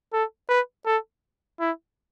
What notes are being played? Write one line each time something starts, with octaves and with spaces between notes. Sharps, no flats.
A4
B4
A4
E4